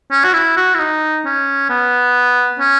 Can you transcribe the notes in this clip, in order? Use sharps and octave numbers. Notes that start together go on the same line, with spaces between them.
C#4
F#4
E4
F#4
E4
D#4
C#4
B3
C#4